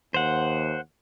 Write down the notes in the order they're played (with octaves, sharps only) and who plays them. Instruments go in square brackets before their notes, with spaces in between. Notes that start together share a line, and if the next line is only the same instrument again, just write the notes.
[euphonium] D#2 [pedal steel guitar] C5 F#5